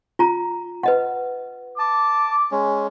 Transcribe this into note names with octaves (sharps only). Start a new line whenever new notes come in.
F4 A#5
B4 D#5 F#5
A5 D6
G#3 C#4